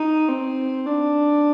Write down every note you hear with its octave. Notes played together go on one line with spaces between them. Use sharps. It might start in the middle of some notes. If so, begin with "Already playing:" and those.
Already playing: D#4
C4
D4